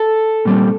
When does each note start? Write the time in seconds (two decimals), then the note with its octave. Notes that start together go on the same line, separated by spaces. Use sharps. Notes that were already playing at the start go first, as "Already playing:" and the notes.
Already playing: A4
0.45 A#2 G3 C4